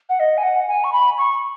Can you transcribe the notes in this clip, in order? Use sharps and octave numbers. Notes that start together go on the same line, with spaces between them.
F#5
D#5
G#5
F#5
G#5
C#6
B5
C#6